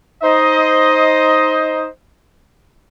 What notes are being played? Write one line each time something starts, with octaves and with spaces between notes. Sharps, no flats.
D#4 C5 D#5